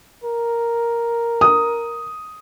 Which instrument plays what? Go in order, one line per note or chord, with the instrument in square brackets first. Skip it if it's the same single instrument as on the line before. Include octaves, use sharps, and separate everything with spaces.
[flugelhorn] A#4
[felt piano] D#6